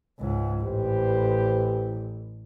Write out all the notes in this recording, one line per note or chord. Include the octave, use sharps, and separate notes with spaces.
C#2 G#2
A1 G4 B4 C5